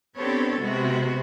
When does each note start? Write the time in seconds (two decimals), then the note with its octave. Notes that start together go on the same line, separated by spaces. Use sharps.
0.18 B3 C4 D4 G4 A4 C#5
0.60 C3 G#3 B3 F#4